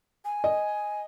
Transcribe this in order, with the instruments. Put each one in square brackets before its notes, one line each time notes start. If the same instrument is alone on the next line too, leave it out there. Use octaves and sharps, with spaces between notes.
[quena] G#5
[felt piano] D#5